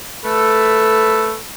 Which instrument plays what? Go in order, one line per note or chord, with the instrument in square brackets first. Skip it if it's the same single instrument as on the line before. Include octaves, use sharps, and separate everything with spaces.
[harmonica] A3 A4 B4